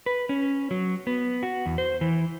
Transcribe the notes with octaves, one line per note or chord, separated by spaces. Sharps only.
B4
C#4
F#3
B3
F#4
E2
C5
E3